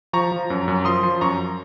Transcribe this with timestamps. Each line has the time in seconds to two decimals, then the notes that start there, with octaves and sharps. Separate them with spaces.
0.13 F3 A#5 C#6
0.32 F3
0.50 F#2
0.68 F#2
0.85 F3 C6 D#6
1.03 F3
1.21 F#2 A#5 C#6